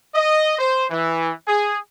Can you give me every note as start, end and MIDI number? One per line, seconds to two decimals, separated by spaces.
0.15 0.57 75
0.59 0.85 72
0.90 1.30 52
1.46 1.76 68